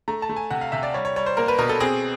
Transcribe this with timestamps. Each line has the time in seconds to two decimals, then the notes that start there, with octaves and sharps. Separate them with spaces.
0.08 A3 A#5
0.22 A5
0.29 A3
0.36 G#5
0.51 C3 F#5
0.61 F5
0.72 C3 E5
0.83 D5
0.94 G3 C#5
1.05 C#5
1.16 G3 C#5
1.26 C5
1.37 A#3 A#4
1.48 B4
1.58 B2 A#4
1.69 A4
1.80 C4 G#4